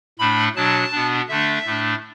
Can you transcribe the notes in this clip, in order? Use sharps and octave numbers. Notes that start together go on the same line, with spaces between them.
A2 A3 D4 B5
B2 F#3 D4 A5
B2 B3 D4
D3 A3 D4 E5
A2 A3 D4